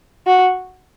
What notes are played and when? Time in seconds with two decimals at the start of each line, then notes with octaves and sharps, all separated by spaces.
0.27 F#4